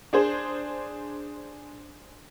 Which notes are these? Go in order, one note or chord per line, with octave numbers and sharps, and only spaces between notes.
D4 G#4 C5